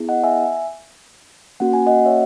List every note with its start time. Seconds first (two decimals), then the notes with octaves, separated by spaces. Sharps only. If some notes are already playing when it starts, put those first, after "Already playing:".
Already playing: B3 E4 G#4
0.09 D#5 F#5
0.24 E5 G#5
1.60 A#3 C#4 F#4 F#5
1.73 G#5
1.87 D#5 F#5
2.05 C#5 E5